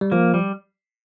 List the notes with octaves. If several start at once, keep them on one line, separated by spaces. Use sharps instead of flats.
G3
F3 A#3
G3